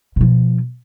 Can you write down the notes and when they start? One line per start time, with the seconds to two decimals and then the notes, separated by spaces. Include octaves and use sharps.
0.16 B2 F3